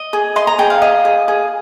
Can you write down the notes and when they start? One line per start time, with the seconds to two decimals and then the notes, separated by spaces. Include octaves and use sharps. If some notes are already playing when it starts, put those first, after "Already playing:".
Already playing: D#5
0.13 G#4
0.36 D#5 C6
0.47 A#5
0.59 G#4 G5
0.70 F5
0.82 D#5
1.05 G#4
1.28 G#4